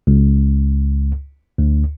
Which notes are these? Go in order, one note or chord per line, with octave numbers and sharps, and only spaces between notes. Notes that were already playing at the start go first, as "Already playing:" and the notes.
C#2
D2